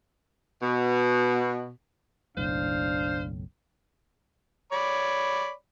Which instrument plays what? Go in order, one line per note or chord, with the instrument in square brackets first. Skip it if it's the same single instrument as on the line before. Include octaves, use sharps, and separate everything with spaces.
[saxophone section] B2
[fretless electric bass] F#1 B1 A2 [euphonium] D4 [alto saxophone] C5 [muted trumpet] F5
[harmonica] C#5 D5 B5